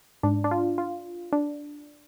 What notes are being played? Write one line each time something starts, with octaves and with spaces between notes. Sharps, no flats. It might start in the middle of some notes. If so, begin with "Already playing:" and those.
G#2 D4
D4
F4
F4
D4